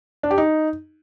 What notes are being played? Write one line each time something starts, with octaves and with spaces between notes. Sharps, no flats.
D4
G4
D#4